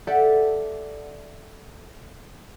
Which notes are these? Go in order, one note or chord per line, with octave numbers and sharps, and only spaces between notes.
G4 A4 D5 E5 F#5